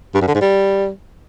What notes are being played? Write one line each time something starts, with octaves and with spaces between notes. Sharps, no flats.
G2
F#2
D3
G#2
G3